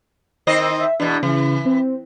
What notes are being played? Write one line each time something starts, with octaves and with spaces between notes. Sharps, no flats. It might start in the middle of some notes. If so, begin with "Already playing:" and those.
D#3 C4 D#5
E5
E2 B2 D4
C#3 E3
C4